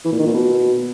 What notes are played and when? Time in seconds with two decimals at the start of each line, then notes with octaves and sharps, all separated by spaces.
0.05 E3
0.12 A#2
0.19 D#3
0.27 A#2
0.34 B2